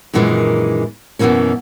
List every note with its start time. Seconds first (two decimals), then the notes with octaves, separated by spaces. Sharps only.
0.14 F#2 A#2 D#3 E3 G3 G#3
1.19 F#2 B2 D3 E3 A#3 C#4